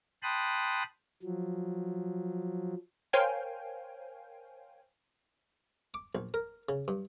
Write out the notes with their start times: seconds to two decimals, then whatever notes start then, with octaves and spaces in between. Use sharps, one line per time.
0.23 G5 A5 B5 C6 D#6 F#6
1.23 F3 F#3
3.13 A#4 C5 C#5 F5 G5 G#5
5.94 D6
6.15 A#1
6.34 A#4
6.69 C#3
6.88 G2